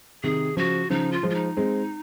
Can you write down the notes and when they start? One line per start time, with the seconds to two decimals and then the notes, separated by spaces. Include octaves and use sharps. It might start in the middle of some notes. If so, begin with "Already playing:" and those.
0.23 C3 D#3 G#4
0.57 C#3 F3 F#4
0.90 C#3 F3 D#4
1.12 F4
1.23 F3 G#3
1.30 F4
1.35 D#4
1.57 G#3 C4